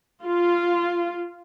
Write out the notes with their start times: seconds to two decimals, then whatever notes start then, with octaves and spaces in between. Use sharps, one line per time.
0.23 F4